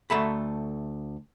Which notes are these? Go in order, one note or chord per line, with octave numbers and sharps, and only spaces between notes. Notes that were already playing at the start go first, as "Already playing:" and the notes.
D2 A3 A4 E5 A#5 B5